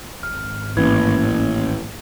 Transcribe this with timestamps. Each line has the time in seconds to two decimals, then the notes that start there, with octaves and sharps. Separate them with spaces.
0.23 G#1 F6
0.77 A1 E3 A#3 C#4 G#6